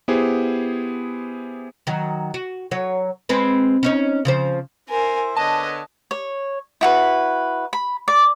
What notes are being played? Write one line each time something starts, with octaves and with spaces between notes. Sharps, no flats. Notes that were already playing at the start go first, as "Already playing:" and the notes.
B3 E4 G4 G#4 C5
D#3 F#3
F#4
F#3 C#5
G#3 C4 B4
C#4 D#4 C#5
C#3 F3 C5
E4 A#4 C5 G#5
D3 B3 C#5 D#5 A5
C#5
E4 F#4 B4
B5
D5